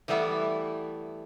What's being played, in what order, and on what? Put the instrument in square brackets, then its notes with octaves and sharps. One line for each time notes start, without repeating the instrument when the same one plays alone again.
[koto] E3 G3 A3 B3 E4